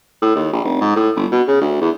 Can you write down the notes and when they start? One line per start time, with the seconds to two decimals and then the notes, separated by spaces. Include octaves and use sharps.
0.22 A2
0.35 D#2
0.53 A#1
0.64 F1
0.81 G#2
0.96 A2
1.16 G1
1.31 B2
1.48 C#3
1.61 D2
1.81 E2